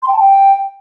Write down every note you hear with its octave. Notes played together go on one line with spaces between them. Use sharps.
C6
G5
A5
G5